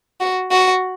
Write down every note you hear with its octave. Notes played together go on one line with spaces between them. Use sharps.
F#4
F#4